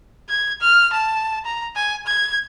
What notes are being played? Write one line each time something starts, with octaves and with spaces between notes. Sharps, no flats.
G#6
F6
A5
A#5
G#5
G#6